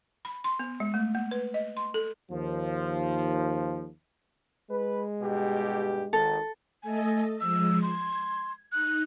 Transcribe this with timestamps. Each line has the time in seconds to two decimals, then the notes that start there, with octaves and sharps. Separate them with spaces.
0.25 B5
0.44 C6
0.59 B3
0.80 G#3
0.94 A3
1.15 A#3
1.31 B4
1.54 D#5
1.77 C6
1.94 A4
2.31 D#2 F3
4.70 G#3 B4
5.22 G2 B2 G4
6.13 G#1 D#3 A4
6.83 A3 A4 D#5 G#5
7.41 F3 G#3 E6
7.82 C6 G#6
8.72 D#4 F#6